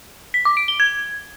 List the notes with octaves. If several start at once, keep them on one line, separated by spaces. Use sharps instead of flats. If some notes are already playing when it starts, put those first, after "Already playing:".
B6
D6
D7
G7
G#6